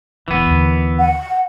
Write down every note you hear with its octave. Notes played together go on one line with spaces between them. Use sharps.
E1 F#2 E3 B3
D#2 D3
F#5